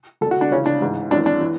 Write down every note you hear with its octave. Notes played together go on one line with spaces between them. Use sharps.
D2 D3 A4
F#4
D4
C#2 C#3 E3 C#4
D4
A1 G#2 E3
G#1 F#2 E3 D4
D4
E3